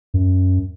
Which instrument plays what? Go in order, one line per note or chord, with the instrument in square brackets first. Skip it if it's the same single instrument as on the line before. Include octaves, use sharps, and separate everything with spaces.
[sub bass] F#2